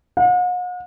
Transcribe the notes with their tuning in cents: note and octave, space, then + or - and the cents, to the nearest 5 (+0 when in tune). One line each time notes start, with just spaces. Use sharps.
F#5 -45